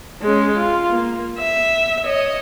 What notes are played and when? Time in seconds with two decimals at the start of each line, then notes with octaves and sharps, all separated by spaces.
0.22 G#3 C#4
0.56 F4
0.90 A#3
1.38 E5
2.04 C#5 D#5